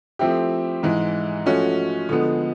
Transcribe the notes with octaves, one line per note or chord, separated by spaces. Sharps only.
F3 A3 C4 E4 G4
G#2 E3 G#3
F3 A3 C#4 F#4
D3 F3 G#3 B3